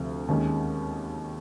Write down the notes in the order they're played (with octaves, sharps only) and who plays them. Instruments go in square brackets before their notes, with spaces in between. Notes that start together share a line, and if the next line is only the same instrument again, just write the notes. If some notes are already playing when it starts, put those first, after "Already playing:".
Already playing: [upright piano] D2 C3 F3
D#2 D#3 G#3 C#4